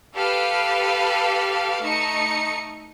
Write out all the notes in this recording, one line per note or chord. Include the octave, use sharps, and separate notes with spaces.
G4 A4 B4 F5
A3 D#4 C#7